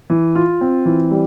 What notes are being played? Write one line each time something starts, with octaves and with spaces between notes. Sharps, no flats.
E3
F4
C4
E3
G3